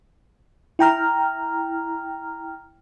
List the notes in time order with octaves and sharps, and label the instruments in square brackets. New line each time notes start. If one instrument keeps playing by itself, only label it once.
[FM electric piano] E4 G5 A#5 F6